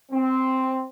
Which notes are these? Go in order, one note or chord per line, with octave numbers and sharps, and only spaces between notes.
C4